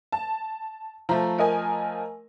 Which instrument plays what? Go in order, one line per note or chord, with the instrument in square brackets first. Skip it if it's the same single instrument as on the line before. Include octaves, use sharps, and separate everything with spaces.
[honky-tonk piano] A5
[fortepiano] F3 A3 [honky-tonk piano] A#5
[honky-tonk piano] A#4 D#5 G#5